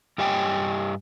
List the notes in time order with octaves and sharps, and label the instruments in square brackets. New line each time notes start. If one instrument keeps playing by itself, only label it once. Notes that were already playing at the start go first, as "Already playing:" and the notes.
[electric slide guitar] G2 G4 D#5 G5 G#5